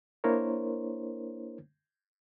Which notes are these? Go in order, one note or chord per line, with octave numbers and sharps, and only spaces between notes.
A#3 D4 E4 A#4 C5 C#5